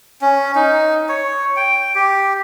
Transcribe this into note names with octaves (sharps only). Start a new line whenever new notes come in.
C#4
D#4
C#5
G5
G4